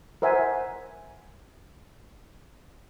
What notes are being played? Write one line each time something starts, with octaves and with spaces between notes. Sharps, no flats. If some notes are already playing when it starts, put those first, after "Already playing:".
A#4 C5 E5 F#5 G#5